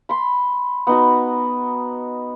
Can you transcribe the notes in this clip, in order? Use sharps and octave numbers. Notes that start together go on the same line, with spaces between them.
B5 C6
B3 D#4 F#4